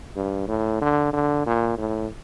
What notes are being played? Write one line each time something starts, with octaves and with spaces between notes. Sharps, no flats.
G2
A2
D3
D3
A#2
A2